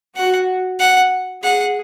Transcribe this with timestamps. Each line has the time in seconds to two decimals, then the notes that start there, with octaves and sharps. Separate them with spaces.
0.16 F#4 F#5
0.79 F#5
1.43 G#4 F#5